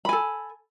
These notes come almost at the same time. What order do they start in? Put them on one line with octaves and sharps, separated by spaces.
B5 G#5 A4